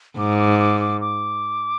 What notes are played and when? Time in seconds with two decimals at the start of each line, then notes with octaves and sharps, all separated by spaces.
0.18 G#2 D6
0.39 D6
0.59 D6
0.81 D6
1.01 D6